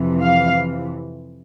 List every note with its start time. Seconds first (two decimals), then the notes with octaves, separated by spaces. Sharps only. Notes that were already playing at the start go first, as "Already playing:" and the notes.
Already playing: F2 C3 E3
0.22 F5